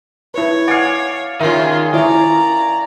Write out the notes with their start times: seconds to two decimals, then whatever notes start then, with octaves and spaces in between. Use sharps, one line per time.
0.34 E4 B4 C#5
0.68 D5 F5 F#5 G#5
1.40 D#3 C#4 F4 G#4 A#4 E5
1.94 E4 C#5 D5 A#5